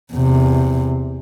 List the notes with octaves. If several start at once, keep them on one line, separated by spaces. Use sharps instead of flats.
E2 C3